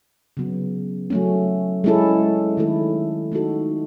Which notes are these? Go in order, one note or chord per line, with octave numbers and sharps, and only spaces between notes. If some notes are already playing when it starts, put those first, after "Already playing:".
C#3 F#3 B3
F#3 A3 C#4
G#3 C#4 E4 A4
D#3 A3 E4 A4
A3 D#4 F#4 A4